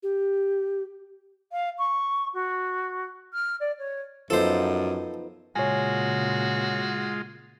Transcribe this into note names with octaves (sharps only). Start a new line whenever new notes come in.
G4
F5
C#6
F#4
F6
D5
C#5
F#2 F3 B3 D#4 A4 C5
A#2 C#3 G#3 F4 F#4 C#5 G#5